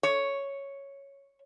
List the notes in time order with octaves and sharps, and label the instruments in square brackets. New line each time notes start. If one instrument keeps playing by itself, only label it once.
[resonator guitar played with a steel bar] C#5